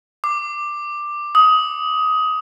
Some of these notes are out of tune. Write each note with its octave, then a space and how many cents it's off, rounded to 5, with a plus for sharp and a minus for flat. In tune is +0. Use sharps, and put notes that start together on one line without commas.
D6 +10
D#6 +20